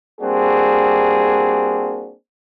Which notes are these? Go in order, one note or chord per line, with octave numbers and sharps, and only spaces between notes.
G3 A#3 C4 D4 F#4 G#4